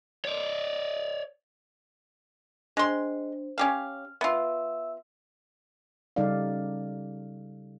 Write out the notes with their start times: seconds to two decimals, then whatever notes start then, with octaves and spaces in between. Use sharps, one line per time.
0.25 C#5 D5
2.77 G#3 D4 C5 C6
3.58 C#4 G4 F5 F6
4.21 B3 F4 E5 E6
6.16 C#3 G3 D#4 A4 D5 F5